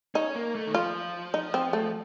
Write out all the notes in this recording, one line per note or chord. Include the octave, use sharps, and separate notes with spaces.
C#4 D#4
A#3
A3
D#3
F3 F4
D#4
C4
A3